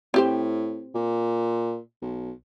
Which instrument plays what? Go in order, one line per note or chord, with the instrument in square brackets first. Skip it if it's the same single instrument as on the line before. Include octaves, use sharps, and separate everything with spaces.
[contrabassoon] A2 [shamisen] C4 G4 C5
[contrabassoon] A#2
B1